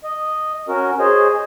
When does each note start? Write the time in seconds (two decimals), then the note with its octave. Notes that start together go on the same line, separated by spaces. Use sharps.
0.04 D#5
0.69 C#4 F#4 A#4
1.00 G#4 C5 C#5 D#5